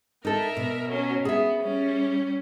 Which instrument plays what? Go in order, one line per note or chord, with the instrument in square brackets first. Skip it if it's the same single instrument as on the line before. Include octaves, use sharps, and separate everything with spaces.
[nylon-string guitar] D#4 A4 [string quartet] A#4 E5
[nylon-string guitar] B2
[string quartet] F#3 C#4
[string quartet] B3 [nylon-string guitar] G#4 E5
[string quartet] G3 C#4